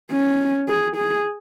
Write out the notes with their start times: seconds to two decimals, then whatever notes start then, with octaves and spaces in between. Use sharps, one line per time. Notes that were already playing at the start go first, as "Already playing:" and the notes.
0.11 C#4
0.68 G#4
0.96 G#4